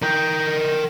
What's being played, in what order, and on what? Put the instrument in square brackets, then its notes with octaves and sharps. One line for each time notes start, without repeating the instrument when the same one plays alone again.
[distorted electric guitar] A#4 G5